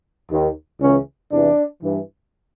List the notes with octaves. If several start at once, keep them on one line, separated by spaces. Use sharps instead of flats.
D#2 D#3
C#2 C#3 E3 C#4
E2 C3 E3 D4
G2 E3